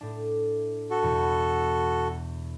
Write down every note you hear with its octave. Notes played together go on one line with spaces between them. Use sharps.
A2 D4
F#4 A4
E2 B2 B5